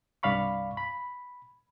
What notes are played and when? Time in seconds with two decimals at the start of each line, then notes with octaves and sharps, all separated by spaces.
0.23 C2 G2 D5 F5 B5 C#6
0.77 B5